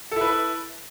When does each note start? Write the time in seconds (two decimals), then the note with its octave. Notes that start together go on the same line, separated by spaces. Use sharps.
0.11 A4
0.16 E4
0.21 B4